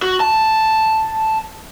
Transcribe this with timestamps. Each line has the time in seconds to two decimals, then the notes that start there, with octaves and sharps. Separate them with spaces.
0.02 F#4
0.20 A5